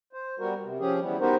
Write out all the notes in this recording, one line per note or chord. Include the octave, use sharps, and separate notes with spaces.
C5
G3 B3 F#4 A#4
C3
F3 C#4 G4 G#4
E3 G3 B3
B3 D#4 F#4 G4 A#4 C5